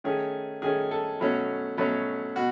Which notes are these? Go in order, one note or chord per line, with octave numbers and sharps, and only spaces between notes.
D#3 A3 C#4 G#4
D#3 A3 C#4 G#4
A4
B2 F#3 A3 C#4
B2 F#3 A3 C#4
B2 F#4